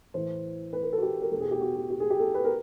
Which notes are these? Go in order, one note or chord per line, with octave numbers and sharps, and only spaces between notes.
A2 E3 C5
B4
A#4
A4
F#4
G4
A#4
E2 B2 A4
G#4
G4
F#4
F#4
G4
G#4
G4
A4
B4
A#4